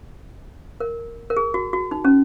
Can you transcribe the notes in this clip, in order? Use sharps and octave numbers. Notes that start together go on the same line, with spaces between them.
A#4
A#4
G#4
F#4
F#4
D#4
C#4